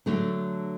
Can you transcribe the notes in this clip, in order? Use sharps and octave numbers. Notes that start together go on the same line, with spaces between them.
D3 F#3 A3 D4